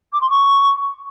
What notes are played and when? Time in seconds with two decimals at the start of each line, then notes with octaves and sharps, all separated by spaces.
0.12 D6
0.21 C6
0.30 C#6